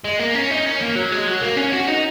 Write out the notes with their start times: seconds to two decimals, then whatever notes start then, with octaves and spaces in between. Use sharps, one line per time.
0.05 G#3
0.20 A#3
0.35 C#4
0.51 D#4
0.66 C#4
0.82 A#3
0.96 F#3
1.12 G#3
1.28 F#3
1.42 A#3
1.57 C#4
1.73 F#4
1.88 D#4